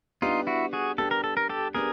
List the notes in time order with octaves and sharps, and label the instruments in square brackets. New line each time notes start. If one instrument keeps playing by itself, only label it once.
[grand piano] G3 B3 D4 G4 [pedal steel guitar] D#4 F4
[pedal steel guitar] E4 F#4
F#4 G#4
[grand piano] G3 B3 D4 G4 [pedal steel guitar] A4
[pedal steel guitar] A#4
A4
A#4
G4 A4
[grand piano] G3 B3 D4 [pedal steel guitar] G#4 A#4